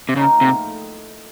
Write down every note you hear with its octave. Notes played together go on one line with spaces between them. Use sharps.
C3
C#3 F3 A#3 D#4
A2 C3